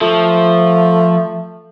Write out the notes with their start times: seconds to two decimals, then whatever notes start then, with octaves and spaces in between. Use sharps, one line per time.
0.01 F3 A3